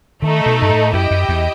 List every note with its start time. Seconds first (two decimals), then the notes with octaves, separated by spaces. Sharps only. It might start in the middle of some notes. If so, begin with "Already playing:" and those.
0.22 D#3 A3 D#4 A4
0.46 B2
0.62 G2
0.69 A2
0.93 F#2 E4 G4 D#5 G5
1.11 F#2
1.29 E2